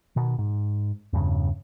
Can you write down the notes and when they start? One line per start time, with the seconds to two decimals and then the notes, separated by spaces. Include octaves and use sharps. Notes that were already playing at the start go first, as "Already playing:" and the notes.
0.16 B2 D#3
0.38 G#2
1.13 E2 G2 C#3